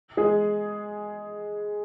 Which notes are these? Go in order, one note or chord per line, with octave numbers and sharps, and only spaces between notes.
G#3 G#4